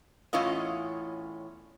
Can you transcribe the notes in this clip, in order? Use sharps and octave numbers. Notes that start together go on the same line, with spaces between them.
E2 A2 C#4 F4 D#5